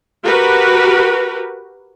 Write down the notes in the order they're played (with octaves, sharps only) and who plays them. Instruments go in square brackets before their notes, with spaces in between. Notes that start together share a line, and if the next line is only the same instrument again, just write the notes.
[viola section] F#4 G4 A#4 B4